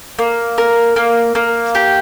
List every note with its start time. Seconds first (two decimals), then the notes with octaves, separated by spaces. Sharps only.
0.19 A#3
0.58 A#4
0.96 A#3
1.35 A#3
1.75 G4